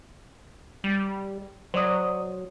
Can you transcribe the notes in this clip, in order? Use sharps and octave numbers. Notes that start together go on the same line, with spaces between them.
G3
F#3 C5 D5 D#6